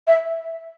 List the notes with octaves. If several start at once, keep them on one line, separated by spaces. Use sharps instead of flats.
E5